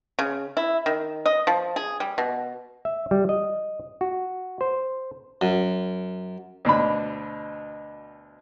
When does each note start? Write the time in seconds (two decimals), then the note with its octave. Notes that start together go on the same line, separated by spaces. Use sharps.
0.19 C#3
0.57 E4
0.86 D#3
1.26 D#5
1.47 F3
1.76 G#4
2.00 G3
2.18 B2
2.85 E5
3.11 G3
3.29 D#5
4.01 F#4
4.61 C5
5.41 F#2
6.65 D2 B2 D4 B5